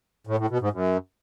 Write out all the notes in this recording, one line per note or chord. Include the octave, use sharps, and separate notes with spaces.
A2
A2
B2
G#2
F#2